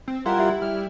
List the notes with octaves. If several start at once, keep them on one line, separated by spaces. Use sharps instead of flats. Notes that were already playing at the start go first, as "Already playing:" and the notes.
C4
G3 E4 F4 A#4 F#5 C6
G4 E5
G3 F6